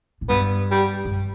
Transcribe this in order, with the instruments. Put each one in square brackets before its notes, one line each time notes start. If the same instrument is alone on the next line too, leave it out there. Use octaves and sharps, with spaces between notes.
[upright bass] A2
[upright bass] G2 [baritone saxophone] B3
[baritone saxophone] G3
[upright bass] G2